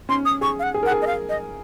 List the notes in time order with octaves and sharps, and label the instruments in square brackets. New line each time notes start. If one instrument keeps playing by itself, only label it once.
[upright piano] C#4 [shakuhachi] C6
[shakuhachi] D#6
[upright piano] G#4 [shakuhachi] C#6
[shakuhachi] F5
F#5
[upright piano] G#4
[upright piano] A#4 [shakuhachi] F#5
[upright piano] G#4
[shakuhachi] D#5
F5
D#5